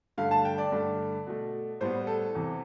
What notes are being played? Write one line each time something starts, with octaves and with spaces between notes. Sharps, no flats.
G2 D3 A3 F5
A5
G5
D5
G2 D3 A3
B2 A3
A2 G3 B3 C5
A4
E2 C3 E3